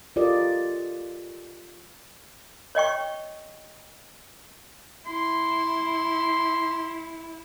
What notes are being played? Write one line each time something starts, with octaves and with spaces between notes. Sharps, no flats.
F4 G4 A4 A#4 D5 D#5
C#5 D#5 G5 C#6
E4 C6